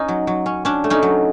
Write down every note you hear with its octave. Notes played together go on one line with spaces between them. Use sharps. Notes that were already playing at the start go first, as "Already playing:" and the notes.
Already playing: C#4 D#4
F#3
F#3
C#4
C#4 D4
A3
C#4 D#4
F#3